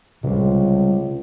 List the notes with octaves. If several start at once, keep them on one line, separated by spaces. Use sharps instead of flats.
C#2 C3 G3